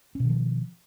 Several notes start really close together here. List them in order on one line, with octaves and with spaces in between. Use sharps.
C#4 B2 D#3 F3